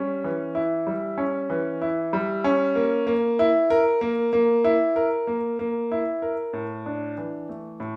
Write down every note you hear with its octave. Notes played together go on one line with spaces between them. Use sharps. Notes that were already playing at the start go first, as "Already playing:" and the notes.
Already playing: G3 C#4
E3
E4
G3
C#4
E3
E4
G3
C#4
A#3
A#3
E4
A#4
A#3
A#3
E4
A#4
A#3
A#3
E4
A#4
A2
D4
E3
A3
A2